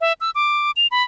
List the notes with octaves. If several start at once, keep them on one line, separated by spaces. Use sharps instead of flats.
E5
E6
D6
F7
B5